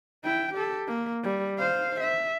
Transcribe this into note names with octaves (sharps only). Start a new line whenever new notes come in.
E4 G5
G4 A4
A#3
G3
C5 F5
E5